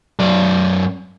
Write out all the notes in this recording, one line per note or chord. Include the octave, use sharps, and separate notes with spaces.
F#2 D5